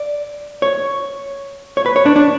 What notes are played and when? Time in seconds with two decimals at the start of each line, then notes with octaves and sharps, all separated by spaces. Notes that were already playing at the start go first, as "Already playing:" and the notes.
Already playing: D5
0.62 C#5
1.77 C#5
1.86 B4
1.96 C#5
2.06 D4
2.16 D4